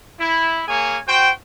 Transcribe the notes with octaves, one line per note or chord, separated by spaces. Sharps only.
E4
A#3 G#4 C#5 G#5
F#4 C5 G5